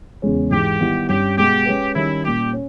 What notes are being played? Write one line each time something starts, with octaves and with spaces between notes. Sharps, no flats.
E2 C#3 G#3 C#4
G#2 E3 G#3 G4
D#3 G3 B3 E4
G2 G3 C#4 G4
B2 G#3 B3 G4
G#3 C#4 G#4 B4
D#3 G3 C#4 E4
A#2 G3 C#4 G4
C#4